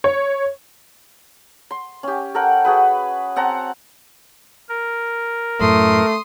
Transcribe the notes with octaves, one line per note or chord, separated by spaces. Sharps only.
C#5
C6
C#4 G4
A4 A#4 F#5 G5
F#4 G#4 B4
C4 F#5 A5 A#5
A#4
F#2 A2 A3 C6 D#6